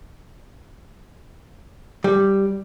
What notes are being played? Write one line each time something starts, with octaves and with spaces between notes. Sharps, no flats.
G3